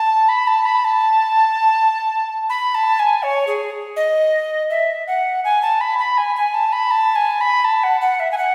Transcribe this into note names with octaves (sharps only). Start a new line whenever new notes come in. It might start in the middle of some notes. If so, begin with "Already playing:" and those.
Already playing: A5
B5
A5
B5
A5
B5
A5
G#5
C#5
G#4
D#5
E5
F#5
G#5
A5
B5
B5
G#5
G#5
A5
B5
A5
G#5
B5
A5
F#5
F#5
E5
G#5
F#5